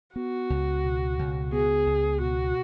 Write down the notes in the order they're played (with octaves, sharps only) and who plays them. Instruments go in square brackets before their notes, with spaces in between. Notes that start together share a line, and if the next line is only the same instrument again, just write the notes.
[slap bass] B3 [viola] F#4
[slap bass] C#2
B2
C#2
[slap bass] B3 [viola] G#4
[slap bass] C#2
[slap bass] B2 [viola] F#4